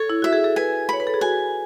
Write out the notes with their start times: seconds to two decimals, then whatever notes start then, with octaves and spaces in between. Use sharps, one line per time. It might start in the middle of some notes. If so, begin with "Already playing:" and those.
Already playing: A4 C#5
0.10 E4
0.22 F#4 E5
0.33 G#4
0.44 A4
0.56 B4 G#5
0.89 C#5 B5
1.00 B4
1.07 A4
1.14 G#4
1.21 F#4 G#5